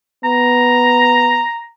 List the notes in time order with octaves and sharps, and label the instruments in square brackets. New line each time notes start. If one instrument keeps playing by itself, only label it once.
[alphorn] B3 [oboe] A#5